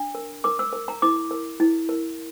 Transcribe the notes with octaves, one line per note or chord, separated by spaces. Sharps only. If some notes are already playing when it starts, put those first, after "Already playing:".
Already playing: D4
A#4
A#4 D6
E6
A#4
A#5
E4 D6
A#4
E4
A#4